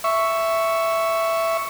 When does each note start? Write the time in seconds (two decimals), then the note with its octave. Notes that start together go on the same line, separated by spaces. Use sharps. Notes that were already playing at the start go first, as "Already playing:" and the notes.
0.04 E5 C#6